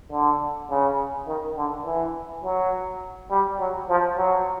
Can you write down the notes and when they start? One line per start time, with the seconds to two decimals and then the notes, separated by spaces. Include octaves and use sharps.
0.12 D3
0.70 C#3
1.27 D#3
1.57 D3
1.85 E3
2.43 F#3
3.30 G3
3.59 F#3
3.89 F3
4.17 F#3